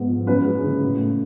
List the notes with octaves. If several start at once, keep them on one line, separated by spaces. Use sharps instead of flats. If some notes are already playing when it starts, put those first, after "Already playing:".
Already playing: G#2 B3
F3
F#2 B4
G#3
C#3
A2
A3